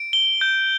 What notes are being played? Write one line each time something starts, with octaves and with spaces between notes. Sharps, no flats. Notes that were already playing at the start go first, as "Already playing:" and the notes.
Already playing: D7
G7
G6